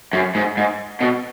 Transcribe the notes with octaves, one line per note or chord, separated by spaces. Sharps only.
F#2
G#2
G#2
B2